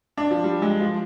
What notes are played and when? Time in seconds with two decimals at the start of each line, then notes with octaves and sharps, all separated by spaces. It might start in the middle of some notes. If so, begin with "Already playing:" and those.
0.18 D4
0.31 F3
0.44 G3
0.62 G#3
0.80 F3